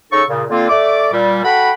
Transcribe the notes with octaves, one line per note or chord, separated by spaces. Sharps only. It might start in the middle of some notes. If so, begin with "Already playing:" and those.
C#3 D#4 A4 C#6
A#2 C#3
D3 A#3 C4 F4
A3 D5 D6
A#2 G3
F#4 A4 F#5 G5 B5